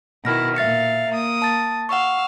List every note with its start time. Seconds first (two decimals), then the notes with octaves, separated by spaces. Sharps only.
0.25 B2 D#3 E4 F6 A#6
0.56 A#2 E5 F5 A6 C#7
1.11 A#3 D#6
1.42 A5 A6
1.89 F5 F#5 C#6 E6